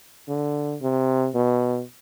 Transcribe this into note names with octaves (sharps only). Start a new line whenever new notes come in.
D3
C3
B2